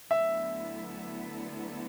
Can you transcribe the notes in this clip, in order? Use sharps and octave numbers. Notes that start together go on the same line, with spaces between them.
D2 D3 F#3 B3 E4 E5